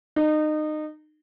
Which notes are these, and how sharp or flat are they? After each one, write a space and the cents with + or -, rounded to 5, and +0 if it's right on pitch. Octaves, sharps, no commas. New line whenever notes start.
D#4 -25